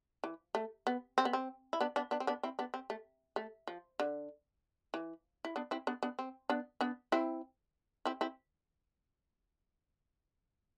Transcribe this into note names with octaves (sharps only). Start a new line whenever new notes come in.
E3
A3
B3
C4
B3
C4
E4
B3 D4
B3 D4
B3 D4
C4
B3 D4
C4 E4
B3 D4
C4
A3
A3
F3
D3
E3
E4
B3 D4
C4 E4
B3 D4
B3 D4
C4
B3 D4
B3 D4
C4 E4
C4 E4
C4 E4